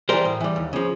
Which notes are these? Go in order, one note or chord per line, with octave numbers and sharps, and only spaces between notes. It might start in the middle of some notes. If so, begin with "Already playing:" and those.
E3 G3 A#4 C5
A2
E3 G3
D#2
C#3 F3